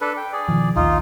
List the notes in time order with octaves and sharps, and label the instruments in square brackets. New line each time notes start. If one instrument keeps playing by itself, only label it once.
[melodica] D4 A4 B4
G5
G#4 D5
[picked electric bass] B2 D#3 F3
[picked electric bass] A#1 D#2 A#2 [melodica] D#4 F4